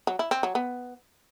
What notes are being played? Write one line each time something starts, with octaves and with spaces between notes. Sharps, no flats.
F#3
E4
C4
F#3
B3